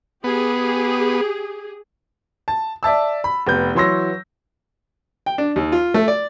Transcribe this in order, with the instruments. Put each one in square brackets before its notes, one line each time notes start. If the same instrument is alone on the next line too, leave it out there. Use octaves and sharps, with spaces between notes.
[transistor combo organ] B3 [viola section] G4 G#4
[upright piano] A5
D5 E5 A5 E6
B5
F1 B3 G6
E3 F#3 C#5 C6 E6 A#6
[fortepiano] G5
D4
D#2
F4
A3
D5